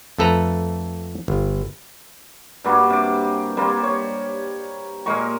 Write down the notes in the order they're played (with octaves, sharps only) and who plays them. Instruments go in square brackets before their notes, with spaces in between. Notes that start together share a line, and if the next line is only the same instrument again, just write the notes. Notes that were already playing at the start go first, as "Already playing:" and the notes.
[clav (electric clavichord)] F2 A3 A4 B4 A#5
G1
[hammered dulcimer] G2 G3 A#3 F#4
C3 D6
G3 A#3 C4
C#5
A#2 G#3 A#4 C#6